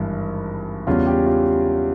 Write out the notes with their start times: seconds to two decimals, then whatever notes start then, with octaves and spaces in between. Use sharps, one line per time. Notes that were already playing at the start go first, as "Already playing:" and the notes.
Already playing: G#1 G2 E3
0.87 E2 C#3 G3 C#4 F4
1.07 G4
1.26 F4